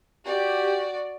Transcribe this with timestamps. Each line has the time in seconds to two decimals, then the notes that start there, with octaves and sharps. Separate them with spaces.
0.25 F#4 G4 D5